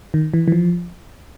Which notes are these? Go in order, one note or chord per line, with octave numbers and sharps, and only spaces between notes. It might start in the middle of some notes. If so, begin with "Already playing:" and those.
D#3
E3
E3
F3